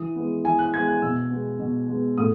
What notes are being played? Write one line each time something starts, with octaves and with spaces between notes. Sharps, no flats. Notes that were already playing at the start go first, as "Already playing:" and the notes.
Already playing: E3 D#6
G#3 B3
E3 G#5
F#6
G#3 B3 G#6
F#6
B2 E6
G#3 B3
B2
G#3 B3
A2 D#6